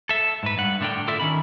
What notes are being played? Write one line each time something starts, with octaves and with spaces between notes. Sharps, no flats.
A4 E5
G#2 B4
G2 F#5
A2 D3 D4 A#4 G5
E4 F4 A4 D5 E5
D#3 C#4 B5